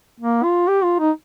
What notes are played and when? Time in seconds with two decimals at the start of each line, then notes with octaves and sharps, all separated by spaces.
0.20 A#3
0.43 F4
0.68 G4
0.84 F4
0.99 D#4